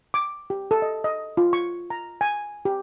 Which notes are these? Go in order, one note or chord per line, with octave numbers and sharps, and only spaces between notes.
D6
G4
A4
D#5
D#5
F4
C#6
A#5
G#5
G4